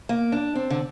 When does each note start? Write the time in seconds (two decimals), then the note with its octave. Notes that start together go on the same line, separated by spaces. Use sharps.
0.09 A#3
0.32 D4
0.55 C4
0.70 D3